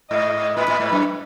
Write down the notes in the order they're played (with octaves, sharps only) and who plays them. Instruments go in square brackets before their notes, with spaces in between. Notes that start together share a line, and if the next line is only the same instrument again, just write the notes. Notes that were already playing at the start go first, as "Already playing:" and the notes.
[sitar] G#2 [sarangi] D#5
[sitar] A2 [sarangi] B4
[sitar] A2
G#2
F#2